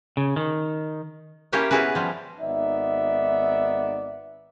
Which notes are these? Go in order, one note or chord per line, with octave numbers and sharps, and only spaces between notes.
C#3
D#3
A#3 C#4 E4 G4 C#5 G#5
B3 C#4 E4 F#4 G#4 B4
F3 G3
G#1 B3 D#4 D5 E5